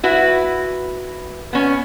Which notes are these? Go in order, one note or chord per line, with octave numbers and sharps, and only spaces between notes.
E4 F#4 B4
B3 C#4